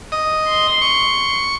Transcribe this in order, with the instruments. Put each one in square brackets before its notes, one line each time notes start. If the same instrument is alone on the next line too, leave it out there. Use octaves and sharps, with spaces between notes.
[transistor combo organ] D#5
[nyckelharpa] C6
[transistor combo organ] C#6